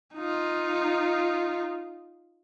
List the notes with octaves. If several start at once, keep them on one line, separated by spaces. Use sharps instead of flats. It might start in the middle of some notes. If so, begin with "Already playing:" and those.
D#4 F4